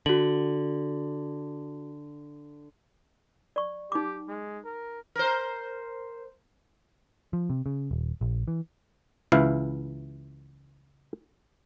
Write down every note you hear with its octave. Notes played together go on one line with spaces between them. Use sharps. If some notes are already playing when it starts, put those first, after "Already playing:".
D3 F#4 F#7
D5 C#6
D#4 G4 D6
G#3
A#4
A#4 C5
F3
C3
C#3
D#1
A#1
E3
C#2 E3 E4 F5